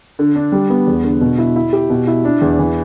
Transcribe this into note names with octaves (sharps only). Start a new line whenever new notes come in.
D3
D4
G3
B3
E2
D3
B2
E4
E4
G4
B2
E4
D4
E2
E3